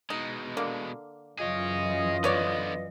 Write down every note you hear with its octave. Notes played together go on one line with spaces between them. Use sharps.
B2 G#3 D#4
D3 A#3
F#2 E3 F4 G#4 C#5 D#5
D3 B3 B4 C#5 D5